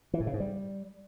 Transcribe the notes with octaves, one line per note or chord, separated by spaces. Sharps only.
E3
A2
C#3
G#2
G3